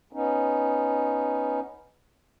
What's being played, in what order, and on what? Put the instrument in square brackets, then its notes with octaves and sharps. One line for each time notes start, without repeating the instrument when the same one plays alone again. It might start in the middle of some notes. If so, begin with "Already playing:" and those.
[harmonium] B3 C#4 D#4